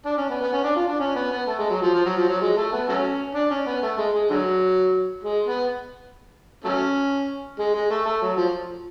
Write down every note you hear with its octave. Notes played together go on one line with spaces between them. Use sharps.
D4
C#4
B3
B3
C#4
D4
F4
D4
C#4
B3
B3
A3
G#3
F#3
F3
F3
F#3
F3
F#3
G#3
A3
B3
F#3 A3 C#4
D4
C#4
B3
A3
G#3
G#3
D3 F#3
G#3
B3
F#3 A3 C#4
G#3
G#3
A3
A3
F#3
F3